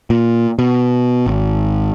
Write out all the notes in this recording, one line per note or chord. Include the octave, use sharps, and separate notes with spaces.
A#2
B2
G#1